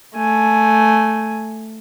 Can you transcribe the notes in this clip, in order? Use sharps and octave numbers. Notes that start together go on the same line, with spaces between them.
A3 G#5